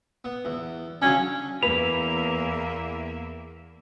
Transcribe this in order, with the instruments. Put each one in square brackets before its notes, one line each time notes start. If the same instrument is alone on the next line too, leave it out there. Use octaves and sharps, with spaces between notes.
[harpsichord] B3
E2
[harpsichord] C#3 F#3 D4 [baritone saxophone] C#4
[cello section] E2 A#3 E5 [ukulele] B4 [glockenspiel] F7